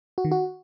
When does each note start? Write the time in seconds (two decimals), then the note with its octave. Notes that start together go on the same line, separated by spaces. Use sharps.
0.18 F#4
0.25 D#3
0.31 F#4